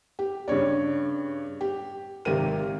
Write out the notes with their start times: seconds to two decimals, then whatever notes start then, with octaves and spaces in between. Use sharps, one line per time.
0.19 G4
0.48 G2 C#3 C#5 D5
1.61 G4
2.25 G#1 C3 G4 A#4 D#7